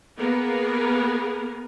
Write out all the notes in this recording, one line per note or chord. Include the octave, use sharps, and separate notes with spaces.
A#3 B3 G#4 A#4